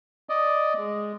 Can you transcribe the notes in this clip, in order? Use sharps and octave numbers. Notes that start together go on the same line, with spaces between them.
D5 D#5
G#3